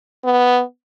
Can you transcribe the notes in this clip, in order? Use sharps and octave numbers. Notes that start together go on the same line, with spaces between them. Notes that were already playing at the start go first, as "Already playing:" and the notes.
B3